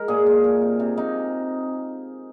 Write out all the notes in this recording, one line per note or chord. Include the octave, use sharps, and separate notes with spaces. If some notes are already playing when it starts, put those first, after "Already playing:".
Already playing: G#3 A#4
A#2 G#4
G#3
A#2
C3
C3
C3 D#4